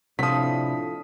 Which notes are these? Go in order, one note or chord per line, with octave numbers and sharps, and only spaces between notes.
A2 C3 F3 F#3 D4 D#6 B6